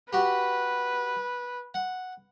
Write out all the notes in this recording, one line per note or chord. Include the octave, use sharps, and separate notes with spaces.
F#4 G4 B4
F#5